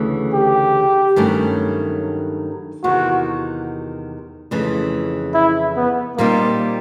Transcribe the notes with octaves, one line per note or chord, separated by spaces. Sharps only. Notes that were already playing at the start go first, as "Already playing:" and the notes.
Already playing: D2 C#3 E3 A3
G4
G2 D#3 F#3 A3 C#4
E2 C3 D#3 F#4
F2 C#3 E3 A3
E4
B3
A#2 G3 A#3 C4 D#4